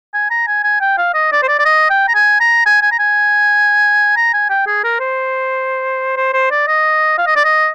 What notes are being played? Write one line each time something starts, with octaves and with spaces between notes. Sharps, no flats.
G#5
A#5
G#5
G#5
G5
F5
D#5
D5
C5
D5
D5
D#5
G5
A#5
G#5
A#5
G#5
G#5
A#5
G#5
A#5
G#5
G5
G#4
A#4
C5
C5
C5
D5
D#5
F5
D#5
D5
D#5